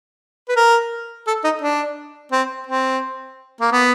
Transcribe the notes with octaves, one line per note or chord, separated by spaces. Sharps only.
B4
A#4
A4
D#4
D4
C4
C4
A#3
B3